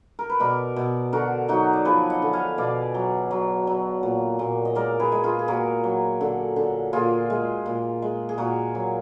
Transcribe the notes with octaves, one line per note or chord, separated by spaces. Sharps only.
A#4
B4
B2 A#4 D5
B2
D3 F#4 A#4
F#3 D#4 F#4
D5
F3 G#4 B4
D#5 F#5
D3
F5 G#5
B2 D5 F5
F#3
F#3
F#3
A#2
A#2
D#5
G#3 A#4 D5
G#4 B4
G#3
F4 G#4
G#4
A#2 F#4 A#4
F#3
D3
D3
A#2 F4 G#4
G#3
A#2
G#3
G#4
A#2 F#4 A#4
F#3